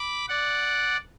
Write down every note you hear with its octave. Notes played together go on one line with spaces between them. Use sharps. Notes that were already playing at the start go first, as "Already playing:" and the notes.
Already playing: B5 D6
D5 F#5